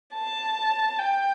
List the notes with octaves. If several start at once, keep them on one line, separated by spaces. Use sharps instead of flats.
A5
G5